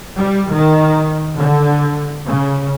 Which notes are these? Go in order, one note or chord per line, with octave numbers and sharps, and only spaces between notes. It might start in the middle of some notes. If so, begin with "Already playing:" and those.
G3
D#3
D3
C#3